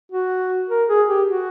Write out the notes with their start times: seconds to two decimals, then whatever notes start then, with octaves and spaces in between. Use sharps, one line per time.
0.12 F#4
0.70 A#4
0.88 G#4
1.09 G4
1.28 F#4